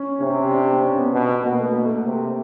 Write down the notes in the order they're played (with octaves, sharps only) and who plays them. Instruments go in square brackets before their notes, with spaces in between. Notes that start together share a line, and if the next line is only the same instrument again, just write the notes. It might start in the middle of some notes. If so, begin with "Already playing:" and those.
Already playing: [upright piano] C#4
[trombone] C3 [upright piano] C#4
[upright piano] D4
C4
C#4
B3
[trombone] B2
[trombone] B2 [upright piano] A#3
[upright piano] A3
A#3
A3
[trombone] C3